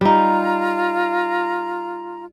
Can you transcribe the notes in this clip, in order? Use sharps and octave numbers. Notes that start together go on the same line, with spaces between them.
G3 D#4 F4 A#5